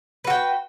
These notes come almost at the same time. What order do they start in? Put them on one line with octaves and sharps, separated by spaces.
B4 F#4 G5